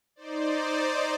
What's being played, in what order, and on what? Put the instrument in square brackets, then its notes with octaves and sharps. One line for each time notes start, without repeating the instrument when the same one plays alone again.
[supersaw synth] D#4 C5 D5